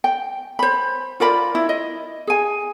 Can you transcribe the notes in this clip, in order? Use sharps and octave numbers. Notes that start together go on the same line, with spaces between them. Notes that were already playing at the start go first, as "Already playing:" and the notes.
G5
C5 B5
F4 A#4 D5 B5
E4
D#5
G#4 G#5